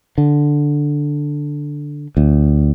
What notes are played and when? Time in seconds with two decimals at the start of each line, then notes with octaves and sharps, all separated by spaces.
0.18 D3
2.17 D2